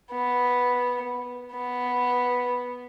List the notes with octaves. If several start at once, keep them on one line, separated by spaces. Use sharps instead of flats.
B3
B3